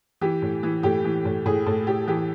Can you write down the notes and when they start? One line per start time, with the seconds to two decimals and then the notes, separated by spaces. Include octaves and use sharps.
0.21 E3 G4
0.42 A2
0.63 E3
0.83 A2 G4
1.04 E3
1.25 A2
1.46 A2 G#4
1.66 A2 A4
1.87 A2 G4
2.07 E3 G4